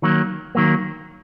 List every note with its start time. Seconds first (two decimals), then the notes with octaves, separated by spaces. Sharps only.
0.02 D#3 F#3 A#3
0.55 D#3 F#3 A#3